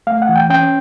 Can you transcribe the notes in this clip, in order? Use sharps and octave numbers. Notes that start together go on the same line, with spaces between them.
A3 F5
F#5
E3
G5
C#4 G5